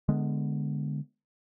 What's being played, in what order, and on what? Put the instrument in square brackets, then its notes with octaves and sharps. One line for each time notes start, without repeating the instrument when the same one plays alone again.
[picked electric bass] D3 G#3 B3